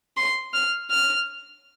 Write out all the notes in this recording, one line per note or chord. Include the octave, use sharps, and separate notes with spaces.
C6
F6
F6